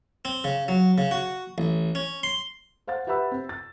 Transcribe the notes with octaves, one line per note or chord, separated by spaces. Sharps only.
C4
C#3
F#3
C#3
F#4
A1
C#4
C6
C5 F5 F#5 A6
G4 B4 E5 F#5 B5 E6
C4
A6